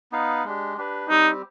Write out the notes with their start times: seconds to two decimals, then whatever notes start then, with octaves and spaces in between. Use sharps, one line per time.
0.12 B3 D#4 B4 F5
0.44 G#3 D4 G4
0.77 D4 G4 B4
1.10 G3 C4 D#4 G4